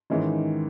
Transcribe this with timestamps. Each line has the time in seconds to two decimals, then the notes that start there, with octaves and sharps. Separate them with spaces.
0.10 G#2 D#3 E3 G#3 C#4